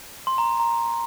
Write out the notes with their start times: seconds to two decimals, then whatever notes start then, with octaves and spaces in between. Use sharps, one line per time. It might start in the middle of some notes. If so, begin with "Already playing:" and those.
0.27 C6
0.38 A#5
0.60 A#5